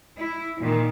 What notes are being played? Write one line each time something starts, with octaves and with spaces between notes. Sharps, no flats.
E4
A#2 D#3